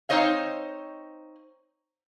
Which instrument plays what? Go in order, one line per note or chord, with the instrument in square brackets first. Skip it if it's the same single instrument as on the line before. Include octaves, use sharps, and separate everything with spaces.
[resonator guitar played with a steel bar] C4 D#4 C5 C#5 D#5 F5